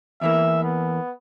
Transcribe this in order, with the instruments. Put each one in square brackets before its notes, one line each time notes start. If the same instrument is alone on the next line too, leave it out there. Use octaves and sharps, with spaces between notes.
[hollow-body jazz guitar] E2 E3 A#3 [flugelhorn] E5
[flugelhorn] B3